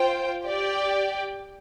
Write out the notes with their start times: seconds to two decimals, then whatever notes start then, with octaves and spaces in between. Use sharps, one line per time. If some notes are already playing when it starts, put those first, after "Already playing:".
Already playing: F4 C5 G5
0.46 G4 D5 G5